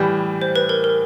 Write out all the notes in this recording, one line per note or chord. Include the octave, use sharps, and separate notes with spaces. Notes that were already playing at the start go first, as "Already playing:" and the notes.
Already playing: A2 E3 G3
C5
B4
A#4
A#4